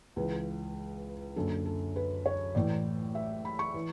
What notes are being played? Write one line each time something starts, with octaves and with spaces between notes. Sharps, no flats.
C#2 C#3 E3 B4
F#1 F#2 D3 A4
A4
B4
C#5
A1 A2 E3 D5
E5
B5
C#6
E3